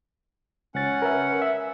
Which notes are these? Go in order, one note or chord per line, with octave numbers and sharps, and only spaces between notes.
C#2 C#4 F#5 A6
A#4 B4 E5
E5